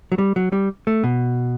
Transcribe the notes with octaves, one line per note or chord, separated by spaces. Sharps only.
F#3
G3
F#3
G3
A3
B2